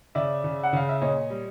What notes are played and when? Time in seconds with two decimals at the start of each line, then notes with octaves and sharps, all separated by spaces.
0.15 C#3 D5 E5
0.44 C#3
0.63 F#5
0.73 C#3 F5
0.89 E5
1.01 A#2 C#5 D#5
1.30 G3